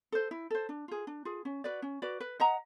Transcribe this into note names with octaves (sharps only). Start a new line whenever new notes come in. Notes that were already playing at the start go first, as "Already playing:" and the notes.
A4 C5
E4
A4 C5
D4
F4 G#4
D4
F4 G#4
C#4
F#4 B4 D5
C#4
F#4 B4 D5
B4
D#5 F#5 A#5